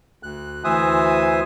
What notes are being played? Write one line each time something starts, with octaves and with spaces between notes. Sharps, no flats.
D2 F#6
D2 E3 C5 E5 G#5 D#6